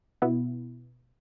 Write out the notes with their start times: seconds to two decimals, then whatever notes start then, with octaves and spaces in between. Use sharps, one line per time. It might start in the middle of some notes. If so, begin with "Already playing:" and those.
0.22 B2 B3 E4